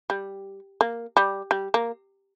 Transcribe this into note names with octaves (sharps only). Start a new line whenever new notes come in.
G3
A#3
G3
G3
A#3